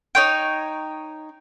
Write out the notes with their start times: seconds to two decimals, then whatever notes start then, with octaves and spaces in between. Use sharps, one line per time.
0.15 D#4 C#5 G5